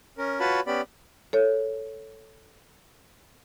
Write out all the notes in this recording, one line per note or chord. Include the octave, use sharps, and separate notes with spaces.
C#4 A#4
F4 F#4 B4 C#5 A5 B5
B3 C#4 G4 D5 B5
A4 C#5